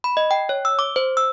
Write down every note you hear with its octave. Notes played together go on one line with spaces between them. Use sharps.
B5
D#5
G5
C#5
E6
D6
C5
E6